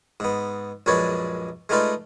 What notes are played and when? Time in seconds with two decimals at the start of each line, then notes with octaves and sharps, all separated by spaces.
0.20 G#2 B3
0.86 A#1 F#2 G#3 B4 C#5 D5
1.69 G#3 A3 D#4 F4 B4 D5